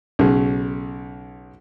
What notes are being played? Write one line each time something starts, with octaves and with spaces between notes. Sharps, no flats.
B1 C#3